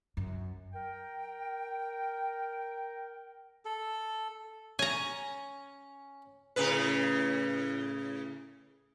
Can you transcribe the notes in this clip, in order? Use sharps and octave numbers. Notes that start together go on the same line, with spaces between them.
F#2
A#4 G5
A4
C#4 G#5 A#5
A2 C#3 B4